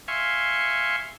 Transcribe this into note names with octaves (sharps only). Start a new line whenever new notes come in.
E5 F5 G#5 C6 C#6